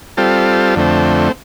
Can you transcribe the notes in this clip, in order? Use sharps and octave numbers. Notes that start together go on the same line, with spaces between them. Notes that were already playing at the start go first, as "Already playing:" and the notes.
G3 C4 F4 A4
F2 D3 A3 C4